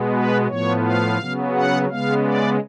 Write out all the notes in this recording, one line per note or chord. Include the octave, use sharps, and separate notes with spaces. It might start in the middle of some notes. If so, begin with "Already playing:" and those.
Already playing: B2 G#3 B3
B4
A2 F3 B3 C#5
F5
C#3 F#3 B3
F#5
C#3 G#3 B3 F5
D5